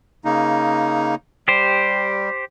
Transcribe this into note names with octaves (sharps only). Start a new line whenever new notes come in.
C#3 A#3 D#4
G3 G4 C5